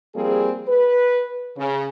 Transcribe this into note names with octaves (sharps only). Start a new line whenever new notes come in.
F3 G3 A#3 C4 G#4
B4
C#3